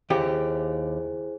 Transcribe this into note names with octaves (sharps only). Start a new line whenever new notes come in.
D#2 E4 G4 G#4 C5